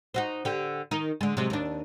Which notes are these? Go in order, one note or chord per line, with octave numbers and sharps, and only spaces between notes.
D#4 F#4 C5
D3 G4
D#3 D#4
D3 G#3
C3 F#3 G#3
D#2 D4